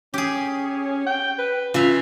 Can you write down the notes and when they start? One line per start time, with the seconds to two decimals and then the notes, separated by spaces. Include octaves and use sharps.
0.14 C#4 G4 G#4
1.06 G5
1.38 B4
1.74 C#3 F4 E5